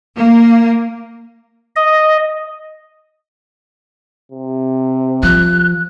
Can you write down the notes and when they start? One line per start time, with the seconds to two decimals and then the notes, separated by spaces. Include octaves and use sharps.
0.16 A#3
1.76 D#5
4.32 C3
5.23 F3 F#6